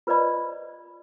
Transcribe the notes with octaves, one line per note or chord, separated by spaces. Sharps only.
F4 B4 C5 D5 D#5 B5